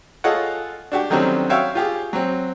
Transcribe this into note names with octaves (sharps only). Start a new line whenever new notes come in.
F4 G#4 A4 C#5 D#5 F#5
D4 F#4 G4
D3 D#3 F#3 G3 C4 C#4
F#4 C#5 E5 F5 G5
F4 G4 G#4
F#3 C4